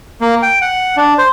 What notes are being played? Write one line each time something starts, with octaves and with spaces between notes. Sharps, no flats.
A#3
G5
F#5
D4
C5